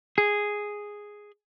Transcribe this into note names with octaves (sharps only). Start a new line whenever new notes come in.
G#4